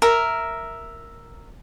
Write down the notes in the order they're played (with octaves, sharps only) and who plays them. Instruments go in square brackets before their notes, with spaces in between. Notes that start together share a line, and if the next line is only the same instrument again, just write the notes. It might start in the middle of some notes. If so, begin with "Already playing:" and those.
[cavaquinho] A#4 E5